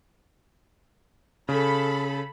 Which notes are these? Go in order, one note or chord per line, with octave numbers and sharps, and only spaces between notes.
C#3 A4 B5